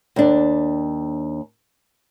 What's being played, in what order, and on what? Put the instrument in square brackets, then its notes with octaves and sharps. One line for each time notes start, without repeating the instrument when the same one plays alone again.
[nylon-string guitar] D#2 D4